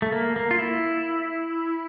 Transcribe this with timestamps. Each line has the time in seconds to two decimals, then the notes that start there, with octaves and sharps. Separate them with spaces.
0.02 A3
0.12 A#3
0.36 A#3
0.51 F4
0.59 E4